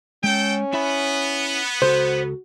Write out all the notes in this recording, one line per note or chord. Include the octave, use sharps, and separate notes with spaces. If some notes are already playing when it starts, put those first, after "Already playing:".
G#3 C#4 A4 G5
B3 E4 E5 B5
C#2 F#4 A4 C5